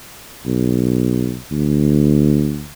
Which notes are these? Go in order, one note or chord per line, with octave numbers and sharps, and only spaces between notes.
B1
D2